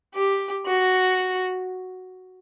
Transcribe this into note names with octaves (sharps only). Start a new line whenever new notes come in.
G4
F#4